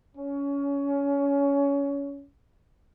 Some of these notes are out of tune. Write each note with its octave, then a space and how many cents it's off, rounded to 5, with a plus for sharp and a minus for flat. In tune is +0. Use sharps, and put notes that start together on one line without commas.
C#4 +20